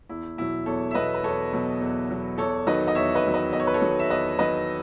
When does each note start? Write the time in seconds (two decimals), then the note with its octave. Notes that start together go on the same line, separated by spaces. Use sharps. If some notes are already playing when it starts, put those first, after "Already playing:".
0.09 E2 E4
0.38 B2 F#3 E4
0.66 E2 A4 C#5
0.91 E5
0.95 B2 F#3 B4 D#5
1.14 B4
1.24 E2 A4 C#5
1.53 B2 F#3
1.81 E2
2.10 B2 F#3
2.38 E2 A4 C#5
2.67 D#3 F#3 B4 D#5
2.88 D#5
2.95 E2 C#5 E5
3.15 B4 D#5
3.25 D#3 F#3
3.34 B4 D#5
3.53 E2 D#5
3.60 C#5
3.67 B4
3.74 A4 C#5
3.82 D#3 F#3
3.99 E5
4.10 E2 B4 D#5
4.39 D#3 F#3 B4 D#5